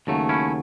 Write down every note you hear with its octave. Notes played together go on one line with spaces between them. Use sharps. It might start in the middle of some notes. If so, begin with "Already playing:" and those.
D#2 C#3 F#3 A3
C#4 E4